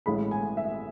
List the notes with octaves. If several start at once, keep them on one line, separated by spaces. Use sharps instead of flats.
A1 A2 G#3 B5
G#5
E5